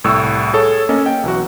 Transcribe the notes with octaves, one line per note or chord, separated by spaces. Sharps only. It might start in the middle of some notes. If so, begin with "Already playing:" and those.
C2 A2 C#6 E6
G#4 A4 C#5
A#3 C#4 A4 D#5
G5
B1 E3 F#4